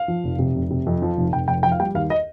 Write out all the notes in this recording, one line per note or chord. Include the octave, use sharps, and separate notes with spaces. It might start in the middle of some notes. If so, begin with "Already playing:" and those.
Already playing: F5
F3
F1
C3
F1
C3
F2
F3
F1
F1 G5
F1 G5
F3 G5
F5
G3 G5
D#2 F5
D#5